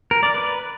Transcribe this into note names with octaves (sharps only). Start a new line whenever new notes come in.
A#4
D5
B4